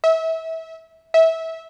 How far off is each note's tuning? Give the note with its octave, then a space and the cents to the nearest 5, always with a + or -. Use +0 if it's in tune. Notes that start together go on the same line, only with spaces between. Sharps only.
E5 -30
E5 -20